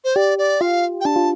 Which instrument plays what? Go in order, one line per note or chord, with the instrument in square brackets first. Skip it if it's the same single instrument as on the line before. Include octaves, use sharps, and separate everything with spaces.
[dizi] C5
[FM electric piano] G4 [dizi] D5
[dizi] D5
[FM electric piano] F4 [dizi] F5
[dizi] G5
[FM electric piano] D4 [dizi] A5
[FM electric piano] F4